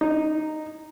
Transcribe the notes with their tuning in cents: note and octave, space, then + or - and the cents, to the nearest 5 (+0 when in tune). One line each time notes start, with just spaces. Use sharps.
D#4 -10